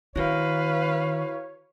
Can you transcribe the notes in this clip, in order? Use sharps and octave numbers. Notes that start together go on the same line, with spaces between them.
D#3 E4 F#4 B4 C#5 F5